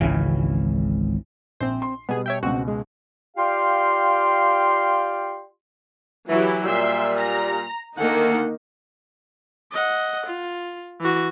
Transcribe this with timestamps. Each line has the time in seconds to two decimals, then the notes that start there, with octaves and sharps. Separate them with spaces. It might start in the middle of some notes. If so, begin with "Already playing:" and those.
0.01 G#1 C#2 C#3 E3
1.60 A#1 C4 C5
1.82 C6
2.09 B2 G3 B3 G#4
2.26 C#5 E5 G5
2.43 C#2 B2 C4 F#4
2.68 G#3
3.37 F4 G4 D5 F5 G5 C6
6.29 E3 F#3 E4 G4
6.65 A#2 G3 E5 C6
7.17 A#5
7.97 D2 D#3 A#3 D#4 A4 F#5
9.72 D#5 F#5
10.26 F4
11.01 E3 F#4